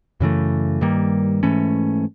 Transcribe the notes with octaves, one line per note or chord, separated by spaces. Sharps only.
F#2 C#3 E3 A3
G2 D#3 G3 A#3
G#2 E3 A3 C#4